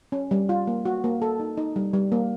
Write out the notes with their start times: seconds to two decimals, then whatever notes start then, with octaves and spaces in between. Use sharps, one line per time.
0.12 C#4
0.31 G3
0.49 F4
0.67 A#3
0.85 F#4
1.04 A#3
1.22 A4
1.40 D#4
1.58 D#4
1.76 G3
1.93 G3
2.12 A#3